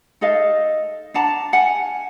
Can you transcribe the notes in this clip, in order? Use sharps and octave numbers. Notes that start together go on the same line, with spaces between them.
D#4 A4 D#5 F5
D4 F#5 A5 A#5
F5 F#5 G#5